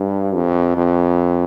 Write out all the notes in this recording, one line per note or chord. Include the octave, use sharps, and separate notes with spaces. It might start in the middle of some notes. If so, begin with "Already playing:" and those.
Already playing: G2
F2
F2